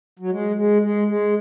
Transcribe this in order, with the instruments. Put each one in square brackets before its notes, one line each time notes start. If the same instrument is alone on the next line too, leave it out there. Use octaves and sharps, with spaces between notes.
[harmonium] F#3
G#3
G#3
G#3
G#3